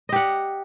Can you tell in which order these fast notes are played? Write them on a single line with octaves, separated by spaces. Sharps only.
D#5 G4 F#5